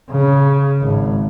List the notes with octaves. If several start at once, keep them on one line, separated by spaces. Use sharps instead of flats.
C#3
G#1